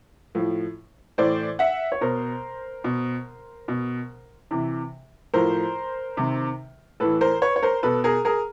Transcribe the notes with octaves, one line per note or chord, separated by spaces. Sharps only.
A2 F3
A2 E3 C5 D5
E5 F#5
C#5
B2 A#4 C5
B2
B2
C3 E3
A2 F3 A#4 C5
C3 D#3
A2 E3 A4 B4
A#4 C5
B4 C#5
C#5
A#4 C5
B2 A4 B4
G#4 A#4
G#4 A#4